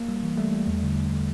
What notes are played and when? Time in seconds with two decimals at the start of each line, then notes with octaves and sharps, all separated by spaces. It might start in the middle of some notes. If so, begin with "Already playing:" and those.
Already playing: A#3
0.09 G3
0.23 E3
0.37 G3 A3
0.53 G3
0.67 E2
0.83 D3